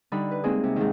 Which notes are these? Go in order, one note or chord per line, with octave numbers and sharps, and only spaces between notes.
D3 G3 D#4 B5
B4
G#3 A#3 C4 D#4 G#4
C3
G#2 D#3